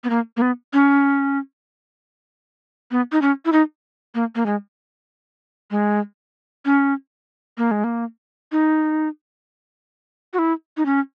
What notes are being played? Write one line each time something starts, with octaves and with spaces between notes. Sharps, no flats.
B3
A#3
A#3
B3
C#4
B3
D#4
C#4
E4
D#4
A#3
A#3
G#3
G#3
C#4
A#3
G#3
A#3
D#4
F#4
E4
D#4
C#4